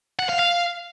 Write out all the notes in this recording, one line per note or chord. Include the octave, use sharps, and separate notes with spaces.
F#5
F5
F5